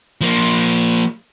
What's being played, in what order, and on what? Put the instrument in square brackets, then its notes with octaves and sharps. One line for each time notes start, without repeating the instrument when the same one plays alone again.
[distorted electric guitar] F3 A#3